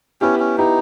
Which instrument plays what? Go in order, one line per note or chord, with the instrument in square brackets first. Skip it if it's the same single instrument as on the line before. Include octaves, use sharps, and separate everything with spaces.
[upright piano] B3 E4 G4 [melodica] C#4
[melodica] C#4
[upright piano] B3 E4 G4 [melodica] D#4